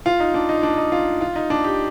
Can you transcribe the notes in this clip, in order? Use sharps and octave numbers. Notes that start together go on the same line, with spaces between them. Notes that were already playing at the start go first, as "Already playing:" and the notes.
F4
D#4
D4
D#4
D4
D#4
F4
F4
D#4
D4
G4